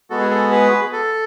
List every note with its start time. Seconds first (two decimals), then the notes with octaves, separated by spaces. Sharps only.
0.10 G#3 B3 F#4 A4
0.20 G#4
0.31 A4
0.51 G#4 B4
0.93 A4